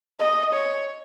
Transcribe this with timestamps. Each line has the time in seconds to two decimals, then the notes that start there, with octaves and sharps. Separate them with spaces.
0.20 D#5
0.54 C#5